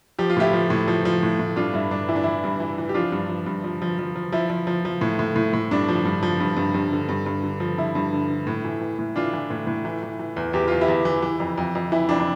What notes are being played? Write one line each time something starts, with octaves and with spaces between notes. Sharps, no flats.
F3 G4
F4
A2 E4 G4
F3
A2
F3
F3
A2
A2
G2 D4 F4
G2 E4
G2 D4
E3 E4
D4
E3 E4
G2
E3
E3
G4
F3 D4 F4
G2
F3
G2
F3
F3
F3
F3
F3 E4
F3
F3
F3
A2
A2
A2
A2
G2 D4
F3
G2
F3
G2
G2
G2
D3
G2
G2
D3
F3
G2 E4
G2
D3
D3
A2
E3
E3
A2
E3 D4 F4
E3
A2
A2
E3
E3
E3
E2
E2 G4
E2 F4
E4 G4
E2
E3
E3
F2
F2
F2
E3 E4
F2 D4
D4